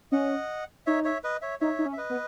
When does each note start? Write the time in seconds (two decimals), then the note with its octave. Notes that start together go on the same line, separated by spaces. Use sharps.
0.12 C#4 D#5 F#5
0.87 D#4 C#5 E5
1.04 C#5 E5
1.24 B4 D#5
1.42 C#5 E5
1.61 D#4 C#5 E5
1.79 D#4
1.86 C#4
1.93 E5
1.97 B4 D#5
2.10 B3